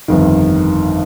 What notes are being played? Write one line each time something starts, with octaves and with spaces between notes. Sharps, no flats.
G1 F2 D#3